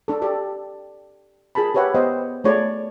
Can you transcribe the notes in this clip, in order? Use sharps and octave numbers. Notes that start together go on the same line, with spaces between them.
D4 A4
G4 A4 D5
F4 G#4 A#4 A5 B5
G4 B4 C#5 E5 F#5
B3 C5 D#5 F5 G5
A3 D4 F4 G#4 C#5 D5